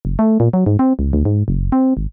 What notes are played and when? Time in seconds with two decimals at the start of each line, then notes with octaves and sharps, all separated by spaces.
0.05 F#1
0.19 A3
0.40 A#2
0.53 F#3
0.66 G#2
0.79 C4
0.99 C#2
1.13 D2
1.25 G#2
1.48 F#1
1.72 C4
1.97 G#1